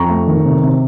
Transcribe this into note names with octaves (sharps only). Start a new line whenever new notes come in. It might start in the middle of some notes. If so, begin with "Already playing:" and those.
Already playing: F2 A#5 C#6
A3
D#3
C3
C3